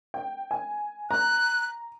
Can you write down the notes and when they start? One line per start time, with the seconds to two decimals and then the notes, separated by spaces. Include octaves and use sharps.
0.14 G5
0.51 G#5
1.11 A#5 F#6